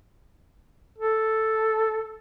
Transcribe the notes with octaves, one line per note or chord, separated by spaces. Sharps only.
A4